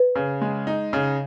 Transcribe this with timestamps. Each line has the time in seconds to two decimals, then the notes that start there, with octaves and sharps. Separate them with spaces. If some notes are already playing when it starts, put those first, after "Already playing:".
Already playing: B4
0.15 C#3
0.42 G#3
0.67 D#4
0.93 C#3